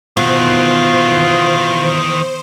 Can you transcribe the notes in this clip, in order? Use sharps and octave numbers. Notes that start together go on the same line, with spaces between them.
B2 D#3 E3 F4 C5